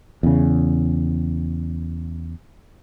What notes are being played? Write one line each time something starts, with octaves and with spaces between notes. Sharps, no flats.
E2 C#3